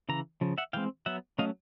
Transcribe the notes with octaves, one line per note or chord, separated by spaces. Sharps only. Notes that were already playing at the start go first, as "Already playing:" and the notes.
C#3 E3 A#5
C#3 F3
E5 F#5
E3 G#3 C4 F5 G5
F#3 B3 E5 F#5
F#3 A3 C#4 D#5 F5